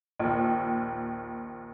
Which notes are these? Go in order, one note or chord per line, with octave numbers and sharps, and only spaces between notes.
A#1 D#2